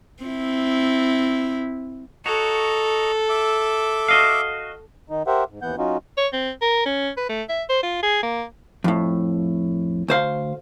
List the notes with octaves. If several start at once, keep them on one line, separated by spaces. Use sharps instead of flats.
C4 E4
F#4 A4 C#5 D#5 A#5 C#6
E5 D6
F#4 D#5 F5
D#3 D#4
G4 A#4 C5 E5 F#5
G#2
D#2 E3 B3 F#5 G6
F#3 C#4 D#4 F4 F#4
C#5
C4
A#4
C#4
B4
A3
E5
C5
F4
G#4
A#3
F2 A2
D2 C5 F5